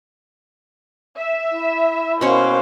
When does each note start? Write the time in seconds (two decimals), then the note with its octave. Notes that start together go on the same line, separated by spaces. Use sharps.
1.17 E5
1.51 E4
2.21 B2 A#3 C#4 C5 F5 C#6